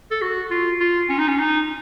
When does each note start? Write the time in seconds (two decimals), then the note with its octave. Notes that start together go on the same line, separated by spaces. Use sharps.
0.11 A4
0.22 F#4
0.51 F4
0.80 F4
1.09 C#4
1.18 D#4
1.28 C#4
1.39 D#4